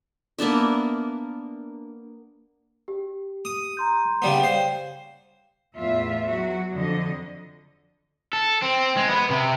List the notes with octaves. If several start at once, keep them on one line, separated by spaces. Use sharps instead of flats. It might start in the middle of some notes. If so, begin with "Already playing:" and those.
A#3 B3 D4 E5
G4
D#6
A#5 C6 G6
C#3 G3 B3
C5 F5 G5
E2 A2 F4 E5
F#3 F#4
F2 D3 D#5
A4
C4
G#3
B3
C3